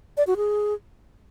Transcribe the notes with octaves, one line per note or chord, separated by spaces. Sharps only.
D5
F#4
G#4